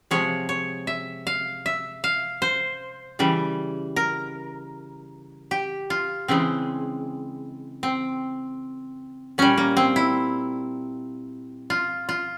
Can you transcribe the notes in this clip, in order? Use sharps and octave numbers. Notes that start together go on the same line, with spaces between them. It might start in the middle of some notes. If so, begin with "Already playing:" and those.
C3 F3 G#3 C#5
C#5
E5
F5
E5
F5
C5
C#3 E3 G3
A#4
G4
F4
C#3 E3 G#3 C4
C4
A#2 G3 C#4
A#3
C4
E4
F4
F4